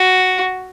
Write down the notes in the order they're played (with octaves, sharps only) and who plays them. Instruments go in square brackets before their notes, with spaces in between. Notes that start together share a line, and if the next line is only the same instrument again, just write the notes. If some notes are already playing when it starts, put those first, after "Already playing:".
Already playing: [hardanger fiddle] F#4